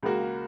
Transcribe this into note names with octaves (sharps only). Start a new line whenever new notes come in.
C#2 C#3 A#3 F#4